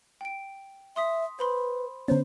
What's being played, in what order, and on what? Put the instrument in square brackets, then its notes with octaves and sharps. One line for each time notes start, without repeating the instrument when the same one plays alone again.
[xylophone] G5 D7
[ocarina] E5 [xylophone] C6 D#6 B6
[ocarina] B4 [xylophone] C5 B5 C6
[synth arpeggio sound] D3 B3 C#4 [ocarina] C5